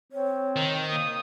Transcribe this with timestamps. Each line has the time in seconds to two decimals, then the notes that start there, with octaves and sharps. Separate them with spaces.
0.12 C4 C#5
0.56 D#3
0.90 A#3 D#6